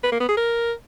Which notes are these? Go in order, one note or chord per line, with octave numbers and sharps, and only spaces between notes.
B4
A#3
B3
G#4
A#4